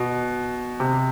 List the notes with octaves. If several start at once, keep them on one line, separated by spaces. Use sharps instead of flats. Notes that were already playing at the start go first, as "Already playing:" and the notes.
Already playing: B2
C3